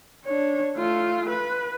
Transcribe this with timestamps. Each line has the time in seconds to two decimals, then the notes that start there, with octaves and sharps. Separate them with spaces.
0.24 D4 C#5
0.77 A3 F4
1.29 B4